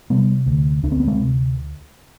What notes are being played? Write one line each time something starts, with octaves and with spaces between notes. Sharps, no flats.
C3 G3 B3
D2
D2 D4
C4
B3
G#3 C4
C3